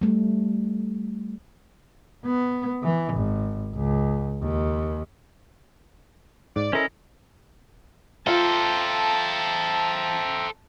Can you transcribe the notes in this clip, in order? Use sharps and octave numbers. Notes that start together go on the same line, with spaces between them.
G3 A3
B3
E3
G#1
C#2
D#2
G#2 D5
C#4 E4 A4 A#4 C5 D#5
F4 A4 C5 E5 G5 A5 A#5